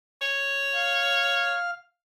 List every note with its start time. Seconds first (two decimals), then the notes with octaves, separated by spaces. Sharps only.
0.22 C#5
0.74 F5 F6